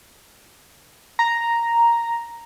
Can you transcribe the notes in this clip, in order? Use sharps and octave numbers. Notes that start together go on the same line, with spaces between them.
A#5